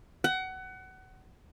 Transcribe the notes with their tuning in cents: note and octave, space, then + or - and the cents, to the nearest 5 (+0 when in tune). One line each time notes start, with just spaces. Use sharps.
F#5 +25